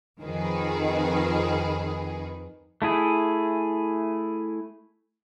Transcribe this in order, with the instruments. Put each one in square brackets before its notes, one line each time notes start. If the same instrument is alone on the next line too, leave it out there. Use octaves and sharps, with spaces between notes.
[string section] F2 D#3 G#4 B4
[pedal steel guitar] A3 E4 G#4